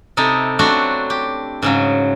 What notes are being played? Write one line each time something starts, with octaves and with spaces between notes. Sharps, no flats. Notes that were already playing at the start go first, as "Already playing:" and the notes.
C3 D#4 E4 A4
F#3 A3 C4 D4 F#4
G4
G#2 C#3 F#3